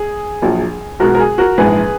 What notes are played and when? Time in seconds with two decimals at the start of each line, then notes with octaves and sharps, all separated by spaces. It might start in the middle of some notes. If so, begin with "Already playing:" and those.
Already playing: G#4
0.42 A#1 A#2 F#3
1.00 B1 B2 G#3 F#4 A#4
1.15 A#4
1.20 G#4
1.38 F#4 A#4
1.58 A#1 G#2 E3 G#3 G#4 B4